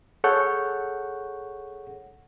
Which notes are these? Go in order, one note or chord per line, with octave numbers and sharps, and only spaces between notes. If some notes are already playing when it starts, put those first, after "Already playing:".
G#4 A4 C#5 F#5 C#6 G6